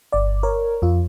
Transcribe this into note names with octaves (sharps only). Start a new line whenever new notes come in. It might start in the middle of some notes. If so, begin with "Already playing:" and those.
G1 D5
A#4 C#5
F2 F4